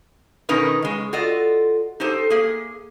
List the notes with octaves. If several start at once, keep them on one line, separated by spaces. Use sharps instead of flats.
B2 D#3 C#4 D#4 A#4 B4
C#3 G#3
F4 F#4 A4 D5 D#5
D#4 G4 A4 C5 A5
A#3 G#4